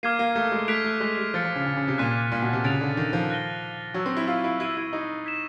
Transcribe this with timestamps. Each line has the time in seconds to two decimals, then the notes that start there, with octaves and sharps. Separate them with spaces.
0.03 A#3 D6 F6 G#6 C7 D#7
0.19 A#3
0.36 A3
0.52 G#3
0.68 A3 F#6 B6 D7 F7
0.84 A3
1.00 G#3
1.18 G3
1.34 F3 F6 A6 C#7
1.44 F3
1.55 C#3
1.66 C#3
1.77 C#3
1.88 C3
1.98 A#2 F#6 B6 D#7
2.32 A#2
2.42 B2
2.53 C3
2.64 C#3 A6 D7 F7
2.81 D3
2.97 D#3
3.13 F3
3.30 F#6 A#6 D#7 G7
3.94 F#3 C#6 E6 G#6
4.06 C4
4.17 E4
4.27 F4
4.44 E4
4.60 E4 G#6 C7 D#7
4.77 E4
4.93 D#4
5.26 G#6 B6 E7